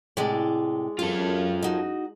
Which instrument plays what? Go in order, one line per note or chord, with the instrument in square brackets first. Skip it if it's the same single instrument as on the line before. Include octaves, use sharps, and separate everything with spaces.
[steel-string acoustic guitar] A2 C3 [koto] G#3 D5
[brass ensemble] F#2 [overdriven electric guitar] F4 A4 [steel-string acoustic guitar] F5
[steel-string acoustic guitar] D#4 F#4